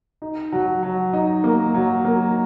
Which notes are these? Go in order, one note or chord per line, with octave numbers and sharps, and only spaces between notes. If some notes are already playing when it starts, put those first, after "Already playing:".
D#4
F#3
F#3
D#4
A#3
F#3
A#3